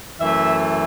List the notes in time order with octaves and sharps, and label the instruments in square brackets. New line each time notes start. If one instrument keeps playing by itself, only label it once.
[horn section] F#2 E3 A3 E5